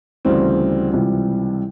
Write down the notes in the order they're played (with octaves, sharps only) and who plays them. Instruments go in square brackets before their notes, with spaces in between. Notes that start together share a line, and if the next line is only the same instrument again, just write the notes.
[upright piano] D2 C#3 E3 G3 C4
C#2 C3 E3 G3